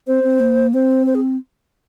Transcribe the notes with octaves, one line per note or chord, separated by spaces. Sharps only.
C4 C5
C4
A#3
C4 C5
C5
G#4